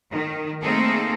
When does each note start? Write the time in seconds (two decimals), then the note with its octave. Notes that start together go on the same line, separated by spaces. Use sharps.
0.12 D#3
0.62 A3 A#3 C4 D#4 G#4 A4